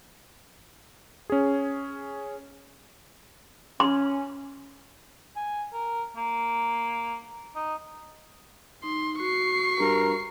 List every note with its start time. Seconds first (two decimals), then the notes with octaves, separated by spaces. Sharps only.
1.30 C#4 G#4
3.80 C#4 C6
5.36 G#5
5.73 A#4
6.16 A#3
7.55 D#4
8.84 D#4 C6
9.20 F#4 C#6 C7
9.80 G2 A#4